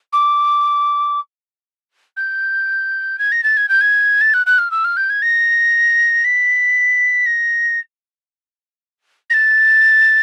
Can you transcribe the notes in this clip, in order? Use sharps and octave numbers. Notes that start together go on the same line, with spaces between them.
D6
G6
G#6
A#6
A6
G#6
G6
G#6
A6
F#6
F#6
F6
E6
F6
G6
G#6
A#6
B6
A#6
A#6
A6